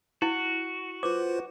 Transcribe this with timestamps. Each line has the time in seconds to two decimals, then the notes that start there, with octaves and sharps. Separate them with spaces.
0.22 E4 F#4
1.03 F4 B4 C5 D6